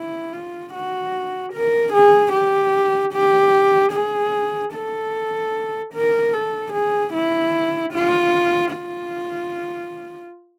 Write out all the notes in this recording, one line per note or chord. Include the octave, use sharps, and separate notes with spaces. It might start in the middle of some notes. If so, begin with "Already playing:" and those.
Already playing: E4
F4
F#4
A#4
G#4
G4
G4
G#4
A4
A#4
A4
G#4
E4
F4
F4